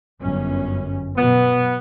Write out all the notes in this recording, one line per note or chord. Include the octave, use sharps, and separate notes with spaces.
G1 F#2 C#4
B2 F#3 B3